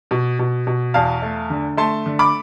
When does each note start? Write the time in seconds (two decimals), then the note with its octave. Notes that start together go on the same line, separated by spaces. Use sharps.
0.11 B2
0.39 B2
0.67 B2
0.94 E2 F5 A5
1.22 A3
1.50 D3
1.77 A3 A5 C6
2.06 D3
2.19 B5 D6